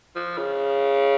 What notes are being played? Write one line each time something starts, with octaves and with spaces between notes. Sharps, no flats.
F3
C#3